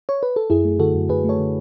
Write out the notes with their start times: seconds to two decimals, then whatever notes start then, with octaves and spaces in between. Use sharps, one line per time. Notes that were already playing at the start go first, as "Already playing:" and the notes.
0.09 C#5
0.23 B4
0.36 A4
0.50 F#2 E4 G#4
0.65 A3
0.79 D3 F#4 A4
0.95 F#2
1.09 F#2 G#4 B4
1.24 A3 A4 C#5
1.39 D3